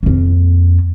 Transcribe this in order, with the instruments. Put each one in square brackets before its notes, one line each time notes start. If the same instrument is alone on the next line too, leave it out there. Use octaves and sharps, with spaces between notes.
[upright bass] F2 A#3